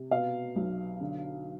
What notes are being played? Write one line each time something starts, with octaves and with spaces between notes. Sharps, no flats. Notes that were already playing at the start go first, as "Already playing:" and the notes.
Already playing: C3
B2 F5
B1
D3